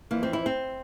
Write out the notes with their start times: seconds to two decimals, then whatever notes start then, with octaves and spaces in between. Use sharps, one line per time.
0.11 F2 E3 A#3
0.23 C4
0.33 E4
0.46 C4